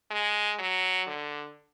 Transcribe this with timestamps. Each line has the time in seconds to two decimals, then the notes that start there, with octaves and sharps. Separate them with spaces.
0.11 G#3
0.59 F#3
1.07 D3